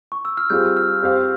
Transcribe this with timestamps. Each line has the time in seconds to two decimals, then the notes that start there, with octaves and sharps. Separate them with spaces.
0.12 C#6
0.25 E6
0.37 F6
0.50 G3 C4 F4 G#4 G6
0.77 F6
1.03 C4 G4 C5 F5